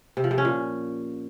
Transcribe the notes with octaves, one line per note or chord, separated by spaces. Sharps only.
C3
F3
C3
C#4
A#2